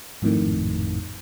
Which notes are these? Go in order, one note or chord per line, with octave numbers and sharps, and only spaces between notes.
G#1 F2 A2 D#3